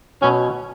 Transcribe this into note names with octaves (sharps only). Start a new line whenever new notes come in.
B2 F#3 C#4